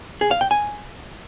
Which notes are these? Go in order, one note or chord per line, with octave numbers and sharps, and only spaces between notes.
G#4
F5
G5
G#5